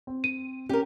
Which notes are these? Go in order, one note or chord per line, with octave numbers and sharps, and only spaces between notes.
C4
D#7
C#4 G4 A#4